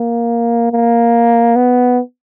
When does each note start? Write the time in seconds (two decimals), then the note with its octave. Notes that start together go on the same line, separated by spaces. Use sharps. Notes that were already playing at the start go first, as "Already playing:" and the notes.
Already playing: A#3
0.73 A#3
1.56 B3